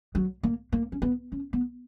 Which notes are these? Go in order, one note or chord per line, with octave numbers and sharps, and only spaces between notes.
F#3
A#3
A#3
C#4
B3
C#4
B3